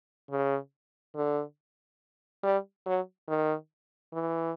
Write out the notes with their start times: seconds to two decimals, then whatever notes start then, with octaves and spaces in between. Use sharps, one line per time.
0.31 C#3
1.16 D3
2.43 G3
2.86 F#3
3.28 D#3
4.13 E3